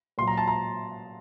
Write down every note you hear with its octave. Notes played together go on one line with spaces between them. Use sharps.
A#2 F#3 C6
A#5
A5
A#5